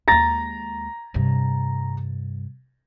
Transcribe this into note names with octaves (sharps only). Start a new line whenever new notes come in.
D#2 G#3 A#5 A6 A#6
G2 C3